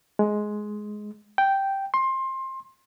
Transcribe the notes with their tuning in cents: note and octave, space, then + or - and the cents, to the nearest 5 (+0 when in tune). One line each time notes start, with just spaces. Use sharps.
G#3 +15
G5 -5
C6 +20